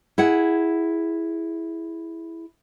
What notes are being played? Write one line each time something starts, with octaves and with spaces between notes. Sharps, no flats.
E4 G#4 F#5